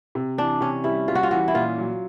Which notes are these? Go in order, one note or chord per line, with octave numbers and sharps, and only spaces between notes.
C3
E3 D4
C3 C#4
G3 E4
G3 F4
F#4
F4
E3 F#4
E4
A#2 F4
F#3